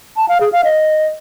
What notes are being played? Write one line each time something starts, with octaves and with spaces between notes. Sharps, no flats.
A5
F5
G#4
F5
D#5